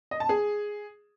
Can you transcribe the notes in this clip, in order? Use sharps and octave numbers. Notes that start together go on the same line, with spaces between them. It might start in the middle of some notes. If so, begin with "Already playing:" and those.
D#5
A5
G#4